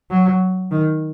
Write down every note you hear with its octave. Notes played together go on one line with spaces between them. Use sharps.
F#3
D#3